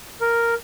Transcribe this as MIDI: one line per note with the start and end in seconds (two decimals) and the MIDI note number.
0.21 0.54 70